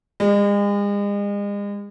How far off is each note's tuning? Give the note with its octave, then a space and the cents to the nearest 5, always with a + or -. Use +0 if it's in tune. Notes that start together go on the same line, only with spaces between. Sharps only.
G#3 -40